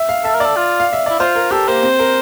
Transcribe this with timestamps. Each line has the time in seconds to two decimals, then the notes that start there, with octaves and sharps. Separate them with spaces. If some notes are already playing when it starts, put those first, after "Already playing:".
Already playing: E5
0.09 F5
0.24 A4 E5
0.35 A#4
0.40 D5
0.45 A4
0.56 F4
0.80 F5
0.93 E5
1.06 E4 D5
1.20 F4 C5
1.36 A#4
1.51 G4 A4
1.68 A#3 C5
1.83 C4
1.99 A#4